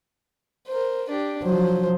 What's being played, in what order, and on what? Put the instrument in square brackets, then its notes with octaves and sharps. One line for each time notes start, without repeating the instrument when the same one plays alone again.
[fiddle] A#4 C5
D4 G4
[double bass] F3 F#3 [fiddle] C5